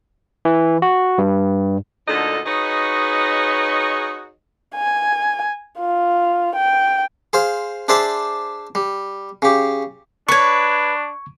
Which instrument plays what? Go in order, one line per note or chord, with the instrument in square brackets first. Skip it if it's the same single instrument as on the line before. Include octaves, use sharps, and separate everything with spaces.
[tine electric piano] E3
F#4
G2
[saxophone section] D2 A#2 D3 D#4 A4 D#5
D#4 F#4 G#4 B4 C#5 D#5
[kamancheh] G#5
F4
G5
[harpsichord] G#4 C5 F5
D4 G#4 C5 D5 E5 A5
G3
C#3 G4
[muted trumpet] D4 [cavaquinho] B4 C#5 [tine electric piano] C#6 G#6